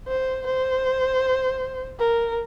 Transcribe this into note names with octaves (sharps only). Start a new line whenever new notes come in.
C5
C5
A#4